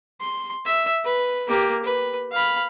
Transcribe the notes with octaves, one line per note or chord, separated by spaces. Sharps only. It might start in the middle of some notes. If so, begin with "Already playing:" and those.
C6
E5
B4
A#3 G4
B4
F5 B5